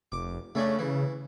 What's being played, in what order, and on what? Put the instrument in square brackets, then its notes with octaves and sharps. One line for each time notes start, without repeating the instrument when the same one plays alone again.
[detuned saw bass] F1 [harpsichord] D6
[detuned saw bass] C#3 [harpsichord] A3 C#4 D4
[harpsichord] E3